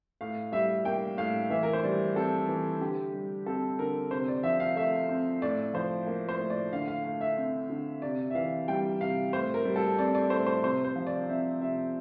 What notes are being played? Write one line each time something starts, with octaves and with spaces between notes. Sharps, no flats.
A2 F5
G3 E5
A#3 G5
A2 F5
E3 E5
A#4
C5
G3 D5
C4 A4
E3
D3 G4
G3
C4 A4
D3 A#4
C3 C5
D5
F3 E5
F5
A3 E5
C4
A2 D5
F3 C5
A#3
C5
A2
D5
D3 F5
F5
A3 F5
E5
C4
D3
C3 D5
E5
E3 F5
G3 G5
C3 F5
A2 C5
A#4
G3
A4
C4 D5
D5
A2 C5
C5
C3 C5
C5
F3
D5
C4 E5
C3 E5